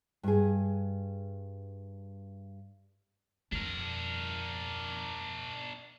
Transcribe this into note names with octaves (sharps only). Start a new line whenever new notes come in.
G2 G#4
F2 D4 A#4